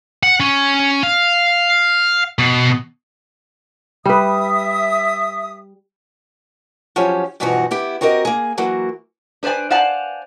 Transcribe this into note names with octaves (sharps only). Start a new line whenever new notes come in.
F#5
C#4
F5
B2
G3 B4 E5 D#6
F3 F#3 C#4 F4 G4
G2 B2 E3 F3 D#4 F#4
B3 E4 G4
C4 F#4 G4 A#4 D#5
A#3 G#4
E3 F#3 A#3 F#4
D4 B4 C5 D5 G#5
C5 D5 F5 F#5 G#5 A5